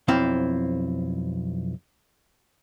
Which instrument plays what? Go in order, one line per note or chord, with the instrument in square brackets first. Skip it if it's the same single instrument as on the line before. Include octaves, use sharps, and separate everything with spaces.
[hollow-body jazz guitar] B1 F2 C4 E4 F5